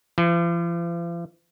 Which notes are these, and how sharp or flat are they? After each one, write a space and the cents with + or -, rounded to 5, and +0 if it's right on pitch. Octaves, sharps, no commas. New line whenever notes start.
F3 -45